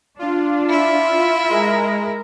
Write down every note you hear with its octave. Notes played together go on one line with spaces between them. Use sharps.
D4 F4
E4 E5
G#3 A#4